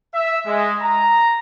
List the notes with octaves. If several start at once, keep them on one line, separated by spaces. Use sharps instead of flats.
E5
G#3
A#5